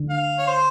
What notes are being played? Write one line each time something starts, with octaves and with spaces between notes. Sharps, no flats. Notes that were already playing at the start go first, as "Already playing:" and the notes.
Already playing: D3
F5
C#5
C5